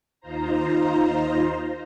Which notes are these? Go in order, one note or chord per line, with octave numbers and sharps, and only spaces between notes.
D#2 D#4 F4 C5 A#5